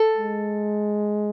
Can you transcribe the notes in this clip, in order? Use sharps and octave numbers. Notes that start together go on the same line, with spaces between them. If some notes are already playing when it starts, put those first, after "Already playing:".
Already playing: A4
G#3